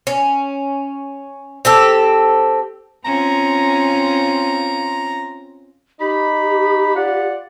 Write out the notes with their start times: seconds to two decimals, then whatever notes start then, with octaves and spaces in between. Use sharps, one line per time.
0.07 C#4
1.65 C4 G4 A4
3.05 C4 C#4 F4 A#5
6.00 D#4 G4 B5
6.95 F4 D5 F#5